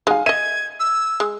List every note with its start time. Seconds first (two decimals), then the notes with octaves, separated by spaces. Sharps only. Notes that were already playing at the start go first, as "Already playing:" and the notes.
0.07 G#3 D#4 F5 G#5
0.26 D#5 E5 G#6 D#7
0.80 E6
1.20 G#3